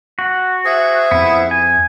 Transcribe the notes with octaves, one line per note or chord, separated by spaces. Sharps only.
F#4
G#4 C5 E5
F2 B3 E4
G#5